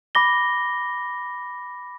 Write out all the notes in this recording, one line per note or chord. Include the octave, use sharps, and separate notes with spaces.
B5 D6 A#6 G7